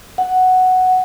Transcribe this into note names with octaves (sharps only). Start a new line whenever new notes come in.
F#5